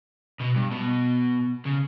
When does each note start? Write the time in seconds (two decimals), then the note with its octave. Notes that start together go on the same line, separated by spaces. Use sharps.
0.40 B2
0.55 G2
0.71 B2
1.65 C#3